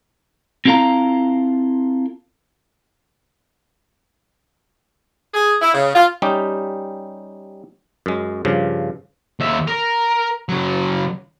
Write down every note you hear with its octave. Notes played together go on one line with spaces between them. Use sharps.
C4 E4 F4 A4 F5 A#5
G#4
E4
C#3
F4
G3 C#4 D#4 G4
F#2 G#3
G2 C#3 F3
D#2 E5
A#4
C#3 F#3